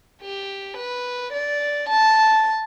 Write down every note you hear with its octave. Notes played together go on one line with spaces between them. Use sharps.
G4
B4
D5
A5